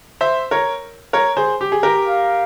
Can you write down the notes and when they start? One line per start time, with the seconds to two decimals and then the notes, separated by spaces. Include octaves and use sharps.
0.21 C5 E5
0.51 A#4 C#5
1.13 A#4 C#5
1.37 G#4 C5
1.61 G4
1.72 G#4
1.83 G4 A#4
2.07 F5